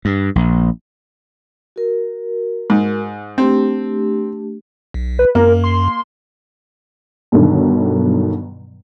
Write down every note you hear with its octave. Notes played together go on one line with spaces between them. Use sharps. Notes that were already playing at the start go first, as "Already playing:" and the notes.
G2
A#1
F#4 A#4
G#2
A3 C4 D4 G4
B1
B4
F#2 A#3 A#4
C6
G2 B2 D3 D#3 F#3